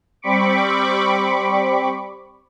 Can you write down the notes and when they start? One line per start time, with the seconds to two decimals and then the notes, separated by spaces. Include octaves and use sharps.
0.22 G3 C4 B5 C#6 D6